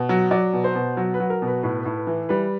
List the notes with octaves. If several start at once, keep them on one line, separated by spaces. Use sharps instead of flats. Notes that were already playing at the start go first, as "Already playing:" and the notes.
Already playing: B2
F#3
F#3 D5
B2
C5
B2
F#3
B4
F#3
A#4
B2
B4
A2 B4
B4
A2
B4
E3
G3 B4